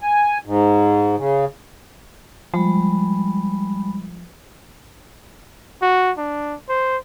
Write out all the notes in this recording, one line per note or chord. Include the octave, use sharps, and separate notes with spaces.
G#5
G#2
C#3
F3 G3 G#3 B5
F#4
D4
C5